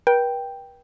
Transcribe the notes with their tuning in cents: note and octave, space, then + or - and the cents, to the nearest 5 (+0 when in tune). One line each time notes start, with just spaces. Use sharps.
B4 -45 G5 +0